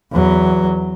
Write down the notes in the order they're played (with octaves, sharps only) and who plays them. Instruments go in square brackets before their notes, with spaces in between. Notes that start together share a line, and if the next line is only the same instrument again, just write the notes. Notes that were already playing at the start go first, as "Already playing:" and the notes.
[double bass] E2 F#3